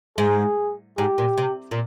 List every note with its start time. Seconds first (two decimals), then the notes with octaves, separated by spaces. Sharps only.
0.18 G#2 G#4
0.97 G#2 G4
1.18 A#2
1.38 C3
1.71 A#2